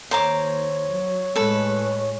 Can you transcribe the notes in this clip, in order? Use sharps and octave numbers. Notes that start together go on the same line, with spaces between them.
D#2 C5 C#5 A#5 D6
F#3
A2 G#3 A4 B4